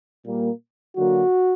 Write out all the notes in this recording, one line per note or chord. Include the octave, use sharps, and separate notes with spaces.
A#2 G3 A#3
D3 F#3 A#3 F#4